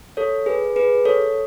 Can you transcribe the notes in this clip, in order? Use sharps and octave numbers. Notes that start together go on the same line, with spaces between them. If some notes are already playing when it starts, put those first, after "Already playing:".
A4 C#5
G#4 B4
G#4 B4
A4 C#5